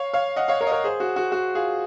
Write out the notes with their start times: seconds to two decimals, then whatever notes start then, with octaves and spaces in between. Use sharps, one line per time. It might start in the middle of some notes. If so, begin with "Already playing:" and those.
Already playing: C#5 F5
0.13 C#5 F5
0.36 D#5 F#5
0.48 C#5 F5
0.61 A#4 C#5
0.67 D#5
0.72 A#4 C#5
0.84 G#4 C5
1.00 F#4
1.16 F#4
1.32 F#4
1.55 F4 G#4